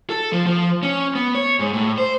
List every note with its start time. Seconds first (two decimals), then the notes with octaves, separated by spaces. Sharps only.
0.10 A4
0.32 F3
0.47 F3
0.83 C#4
1.15 B3
1.35 C#5
1.59 G#2
1.73 A2
1.98 C5